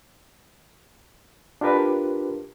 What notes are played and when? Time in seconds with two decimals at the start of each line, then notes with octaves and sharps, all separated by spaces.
1.61 D4 F4 G4 A#4 B4